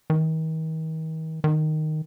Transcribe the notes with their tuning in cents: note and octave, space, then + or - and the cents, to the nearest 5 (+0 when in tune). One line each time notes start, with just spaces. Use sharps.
D#3 +40
D#3 -5